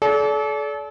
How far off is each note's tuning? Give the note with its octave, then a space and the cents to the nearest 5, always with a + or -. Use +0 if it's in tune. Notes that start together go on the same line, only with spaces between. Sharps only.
A4 -40 D5 -30